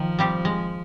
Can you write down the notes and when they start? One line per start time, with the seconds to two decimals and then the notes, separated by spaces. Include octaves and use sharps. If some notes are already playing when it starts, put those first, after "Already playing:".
Already playing: D#3 F3
0.19 G3 C4 G4
0.45 G#3